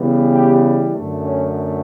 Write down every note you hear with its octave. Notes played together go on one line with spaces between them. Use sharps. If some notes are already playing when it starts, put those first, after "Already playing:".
Already playing: C#3 E3 G3 B3
G4
F#2 D3 A3
C#4